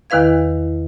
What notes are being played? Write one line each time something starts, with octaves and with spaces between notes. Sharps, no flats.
E2 D#3 E4 B4 F5 G#6